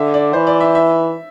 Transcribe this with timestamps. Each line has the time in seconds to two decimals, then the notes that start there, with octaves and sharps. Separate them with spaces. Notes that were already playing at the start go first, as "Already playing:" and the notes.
Already playing: D3 E5
0.14 D5
0.33 E3 C5
0.47 D5
0.60 E5
0.75 E5